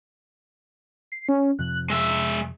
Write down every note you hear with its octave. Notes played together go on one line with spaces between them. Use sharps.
C7
C#4
F2 C3 F3 F#6
G#3 E5 E6